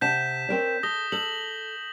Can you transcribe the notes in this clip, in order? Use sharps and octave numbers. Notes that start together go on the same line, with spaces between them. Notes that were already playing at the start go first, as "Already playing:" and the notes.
C3 F#5 A5 G6 B6 E7
C4 A#4 C#5
A4 D#6 A#6 G7
A4 F#7